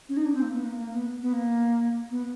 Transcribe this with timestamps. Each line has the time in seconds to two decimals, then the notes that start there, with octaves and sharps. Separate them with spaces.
0.09 C#4
0.17 D#4
0.25 D4
0.34 C4
0.42 A#3
0.53 B3
0.64 A#3
0.76 A#3
0.93 B3
1.22 B3
1.33 A#3
2.10 B3